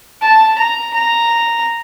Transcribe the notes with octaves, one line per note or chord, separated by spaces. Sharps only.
A5
A#5
A#5